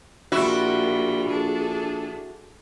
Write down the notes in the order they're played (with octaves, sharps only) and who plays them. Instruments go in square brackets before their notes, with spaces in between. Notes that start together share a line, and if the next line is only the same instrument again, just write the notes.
[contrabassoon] A#1 [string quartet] A#2 G3 [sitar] E4 F#4
[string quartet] D4 G#4 A4